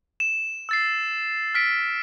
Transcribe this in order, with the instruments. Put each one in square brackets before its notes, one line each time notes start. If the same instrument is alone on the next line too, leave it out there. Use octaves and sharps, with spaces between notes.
[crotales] E7
E6 A6 C7
F6 B6 D7